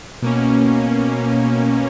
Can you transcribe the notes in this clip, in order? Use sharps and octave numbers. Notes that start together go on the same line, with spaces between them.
B2 A#3 C#4